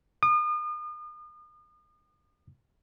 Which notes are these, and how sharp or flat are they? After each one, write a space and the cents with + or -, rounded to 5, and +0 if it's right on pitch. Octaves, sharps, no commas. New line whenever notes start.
D#6 -40